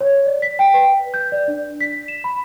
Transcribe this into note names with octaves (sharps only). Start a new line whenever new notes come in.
C#5
D5
B6
G5
B4
G6
D5
D4
B6
E7
B5